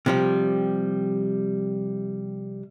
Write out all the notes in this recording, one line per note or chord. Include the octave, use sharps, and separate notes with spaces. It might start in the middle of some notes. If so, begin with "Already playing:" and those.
C3 F3 G3